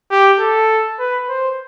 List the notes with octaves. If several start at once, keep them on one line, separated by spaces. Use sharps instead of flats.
G4
A4
B4
C5